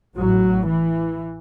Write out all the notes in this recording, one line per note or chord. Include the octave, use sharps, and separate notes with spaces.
A1 A2 F#3
E3